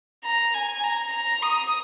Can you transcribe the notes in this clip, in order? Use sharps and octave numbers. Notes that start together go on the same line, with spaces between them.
A#5
G#5
A#5
A#5
D#6